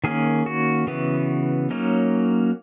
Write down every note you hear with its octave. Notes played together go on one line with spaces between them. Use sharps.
D#3 A#3 C#4 G#4
F#4
C#3 E3 B3
F#3 A#3 C#4 D#4